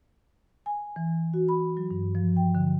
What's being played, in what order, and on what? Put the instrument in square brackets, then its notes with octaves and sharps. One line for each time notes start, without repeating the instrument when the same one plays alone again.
[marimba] G#5
E3
F#4
B5
F#3
G2
F3
G5
D3